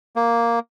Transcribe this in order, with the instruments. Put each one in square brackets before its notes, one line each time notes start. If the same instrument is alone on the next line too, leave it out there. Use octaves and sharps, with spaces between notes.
[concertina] A#3